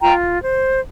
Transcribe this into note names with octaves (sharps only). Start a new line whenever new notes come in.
F4 G5 A#5
C5